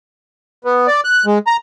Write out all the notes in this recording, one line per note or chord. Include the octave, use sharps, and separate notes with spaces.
B3
D5
F#6
G#3
A#5